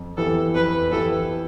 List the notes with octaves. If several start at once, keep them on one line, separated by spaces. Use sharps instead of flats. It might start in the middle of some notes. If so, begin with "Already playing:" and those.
Already playing: F2
E3 B3 E4 G4 A4
F2 B4
E3 B3 E4 G4 A4